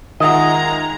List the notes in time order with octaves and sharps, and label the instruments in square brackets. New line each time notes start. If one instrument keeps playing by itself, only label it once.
[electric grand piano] D#3 [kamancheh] G#3 A#5 [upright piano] F4 E5 F#5 [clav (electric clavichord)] D#5